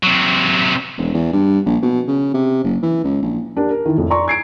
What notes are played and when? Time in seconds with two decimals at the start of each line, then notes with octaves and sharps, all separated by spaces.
0.03 C3 F#3
0.97 E1
1.14 E2
1.33 G2
1.66 A#1
1.83 B2
2.07 C#3
2.34 C3
2.63 F#1
2.82 E3
3.04 C#2
3.22 A#1
3.56 D4 G4 A#4
3.71 A#4
3.85 D#3 E3 E4
3.98 F2 A2
4.10 D5 A#5 C6 C#6
4.28 G#6 C7 D7